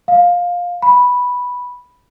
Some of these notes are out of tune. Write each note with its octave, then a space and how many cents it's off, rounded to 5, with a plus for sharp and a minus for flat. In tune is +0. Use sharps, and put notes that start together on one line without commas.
F5 +15
B5 -5